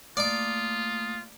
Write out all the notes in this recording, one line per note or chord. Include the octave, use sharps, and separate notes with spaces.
A3 A#3 F4 D5 D6 D#6